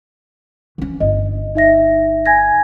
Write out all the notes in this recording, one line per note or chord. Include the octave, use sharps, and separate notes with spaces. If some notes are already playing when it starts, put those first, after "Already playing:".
E3 C#4
G1 D#5
D#4 E5 A#6
G#5 G#6 A#6